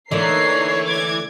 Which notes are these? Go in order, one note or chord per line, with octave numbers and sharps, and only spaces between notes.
D3 E3 A3 A#3 D#4 A#4 C#5 C7
D6 G#6